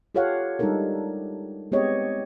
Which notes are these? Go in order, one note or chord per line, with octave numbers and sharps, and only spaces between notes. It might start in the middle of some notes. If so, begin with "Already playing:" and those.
F4 G4 A4 C#5 F5 F#5
G3 G#3 D4 D#4 A4 A#4
G#3 B3 C4 G4 C#5 D#5